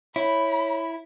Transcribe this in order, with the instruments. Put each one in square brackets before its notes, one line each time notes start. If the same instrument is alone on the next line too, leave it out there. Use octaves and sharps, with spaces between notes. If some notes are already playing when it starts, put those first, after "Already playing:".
[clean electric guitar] E4 [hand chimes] C#5 [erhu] B5